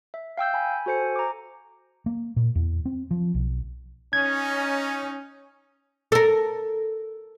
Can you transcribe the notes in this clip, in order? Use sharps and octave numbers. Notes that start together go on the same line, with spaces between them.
E5
F5 G5 E6 G6
G#5 B5
F#4 A4 C5 G#5 C#7
A#5 D6
A#3
A#2
E2
C4
F3
B1
C#4 D#4 G#6
A4 A#4